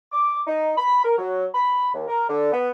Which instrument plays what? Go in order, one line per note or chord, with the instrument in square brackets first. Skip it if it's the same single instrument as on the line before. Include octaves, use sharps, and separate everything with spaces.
[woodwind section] D6
D#4
B5
A#4
F#3
B5
D#2
A#4
D3
B3